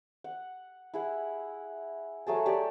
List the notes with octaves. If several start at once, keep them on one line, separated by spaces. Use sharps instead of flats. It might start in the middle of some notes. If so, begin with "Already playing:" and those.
F#5
E4 G#4 F#5
F#3 A3 G#4 A5
G4 D5